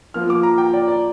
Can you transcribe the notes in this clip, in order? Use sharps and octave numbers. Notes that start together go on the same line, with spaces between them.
F3 A#3 F4 F6
D6
A#5
G5
D5
D5